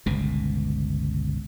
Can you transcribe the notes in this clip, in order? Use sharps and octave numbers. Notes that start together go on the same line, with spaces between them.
G1 C#2 B2